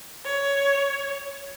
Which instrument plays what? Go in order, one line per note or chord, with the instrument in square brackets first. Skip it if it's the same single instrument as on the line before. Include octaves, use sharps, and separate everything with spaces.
[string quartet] C#5